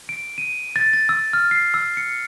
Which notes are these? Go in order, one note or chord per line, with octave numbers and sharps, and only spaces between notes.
D7
D#7
A6
A6
E6
F6
C7
E6
C#7